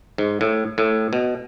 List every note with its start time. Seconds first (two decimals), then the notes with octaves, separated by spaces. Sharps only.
0.18 G#2
0.41 A2
0.78 A2
1.13 B2